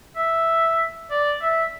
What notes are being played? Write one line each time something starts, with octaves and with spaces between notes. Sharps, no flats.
E5
D5
E5